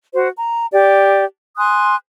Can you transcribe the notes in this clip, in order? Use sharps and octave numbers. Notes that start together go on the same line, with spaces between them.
F#4 C5
A#5
G4 D5
G#5 C6 D#6 F#6